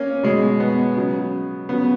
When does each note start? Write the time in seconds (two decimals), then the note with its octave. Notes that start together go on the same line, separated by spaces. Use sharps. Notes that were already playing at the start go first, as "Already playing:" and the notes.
Already playing: A#3 C#4
0.23 B2 G#3
0.60 B3
0.96 C#3 F#3
1.69 C#3 F#3 B3